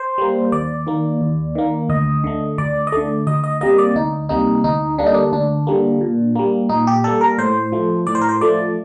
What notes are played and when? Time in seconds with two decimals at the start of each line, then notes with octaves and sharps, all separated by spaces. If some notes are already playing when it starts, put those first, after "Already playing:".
Already playing: C5
0.18 G3 A#3
0.52 D#2 D5
0.87 D#3 A#3
1.21 D#2
1.55 D#3 A#3
1.89 D2 D#5
2.24 D3 A3
2.58 D2 D5
2.87 D#5
2.92 D3 A3 D5
3.27 D2 D#5
3.44 D#5
3.61 C3 G3 A#3 D#5
3.78 D5
3.96 D2 D#4
4.29 C3 G3 A#3 D#4
4.64 D2 D#4
4.98 D3 G3 A#3 D4
5.06 D#4
5.14 D4
5.33 D2 D4
5.67 D3 G3 A#3
6.01 A#2
6.36 G3 A#3
6.69 A#2 D#4
6.87 G4
7.04 G3 A#3 A4
7.21 A#4
7.38 A2 C5
7.72 F3 A3
8.07 A2 D5
8.15 C5
8.21 A#4
8.29 C5
8.41 F3 A3 D5